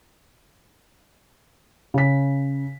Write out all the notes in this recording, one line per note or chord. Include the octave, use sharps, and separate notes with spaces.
C#3 B6